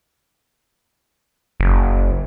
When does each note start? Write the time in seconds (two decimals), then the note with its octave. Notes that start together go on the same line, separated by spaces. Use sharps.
1.60 F#1